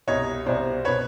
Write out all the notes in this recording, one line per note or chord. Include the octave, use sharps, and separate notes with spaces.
C2 B2 C#5 D#5
C2 B2 C5 D5
B2 B4 C#5